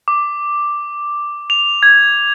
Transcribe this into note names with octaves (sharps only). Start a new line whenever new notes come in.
D6
F7
G#6